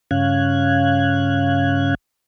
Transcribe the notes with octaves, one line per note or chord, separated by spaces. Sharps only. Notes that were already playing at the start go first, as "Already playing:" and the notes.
G2 C#3 C#4 F5 F#6 G#6